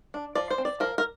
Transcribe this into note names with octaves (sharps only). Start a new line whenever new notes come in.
D4
F3 D5
C5
C4
D5
F3 A#4
A#4